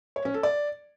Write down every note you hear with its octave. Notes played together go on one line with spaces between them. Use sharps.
C#5
C#4
A4
D5